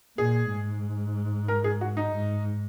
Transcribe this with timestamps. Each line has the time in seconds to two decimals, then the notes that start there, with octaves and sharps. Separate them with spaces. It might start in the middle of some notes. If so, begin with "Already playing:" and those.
0.18 A#2 G#4
0.51 G#2
1.48 A#4
1.64 G#4
1.81 F#4
1.97 D#4
2.14 G#2